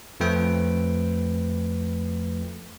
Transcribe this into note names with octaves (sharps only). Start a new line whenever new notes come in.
F2 F3 A3 B4 G5